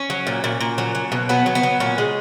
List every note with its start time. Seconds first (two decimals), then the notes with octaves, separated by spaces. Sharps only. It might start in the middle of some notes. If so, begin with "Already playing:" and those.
Already playing: C#4
0.10 F#3
0.27 A#2
0.44 A#2
0.61 A#2
0.78 F#3
0.95 F#3
1.12 B2
1.29 F#3 B3
1.46 F#3
1.55 B3
1.63 F#3
1.80 A#2 C#4
1.98 G#3